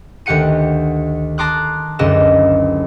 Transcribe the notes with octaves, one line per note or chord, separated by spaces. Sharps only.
D2 D#3 G4 F#5 C#7 D#7
A5 A#5 C6 D6 D#6 F#6
F#1 C#2 D3 D#5 E7